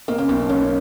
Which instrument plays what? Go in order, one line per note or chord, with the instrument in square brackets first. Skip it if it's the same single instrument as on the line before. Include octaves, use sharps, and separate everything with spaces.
[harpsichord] B2 [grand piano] A#3
[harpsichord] C#3
[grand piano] B1 [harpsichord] B2
[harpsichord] C#3 [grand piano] C#4